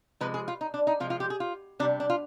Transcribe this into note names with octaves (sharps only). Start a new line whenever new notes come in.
C3 F3 G#3 B4
G#4
F4
D#4
D4
D#4
C3 F3 G#3 F4
F4
G4
G#4
F4
C3 G3 D4
D4
F4